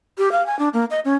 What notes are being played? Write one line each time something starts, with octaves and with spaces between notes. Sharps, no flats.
G4
F5
G#5
D4
A#3
D#5
C#4